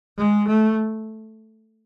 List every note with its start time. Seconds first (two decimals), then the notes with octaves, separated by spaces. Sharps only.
0.18 G#3
0.48 A3